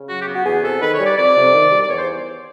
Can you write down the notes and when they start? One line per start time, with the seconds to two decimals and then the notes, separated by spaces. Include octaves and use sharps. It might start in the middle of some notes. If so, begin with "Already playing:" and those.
Already playing: C#3
0.10 F#3 F#4
0.22 G4
0.28 B3
0.34 F#4
0.45 E2 G#4
0.64 C3 A4
0.82 D#3 B4
0.94 C#5
1.00 G3
1.06 D5
1.18 F2 D5
1.36 C3
1.54 D#3
1.72 G3
1.82 D5
1.90 E2 C#5
1.99 C5